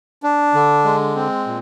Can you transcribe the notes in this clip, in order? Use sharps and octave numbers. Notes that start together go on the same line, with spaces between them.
D4
D3
G#3
C4
A#2